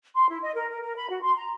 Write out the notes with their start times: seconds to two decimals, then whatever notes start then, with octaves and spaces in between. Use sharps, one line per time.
0.15 C6
0.30 E4
0.42 D#5
0.55 A#4
0.69 A#4
0.82 A#4
0.96 B5
1.09 F#4
1.22 C6
1.37 A#5